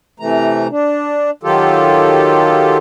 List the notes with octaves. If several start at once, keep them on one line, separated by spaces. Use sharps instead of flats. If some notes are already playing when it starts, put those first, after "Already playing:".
C3 E3 A3 A#5
D4
D#3 F#3 F4 G4 A4